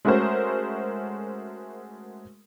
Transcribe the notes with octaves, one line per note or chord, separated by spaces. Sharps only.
G#3 A3 C#4 F#4 A#4 C5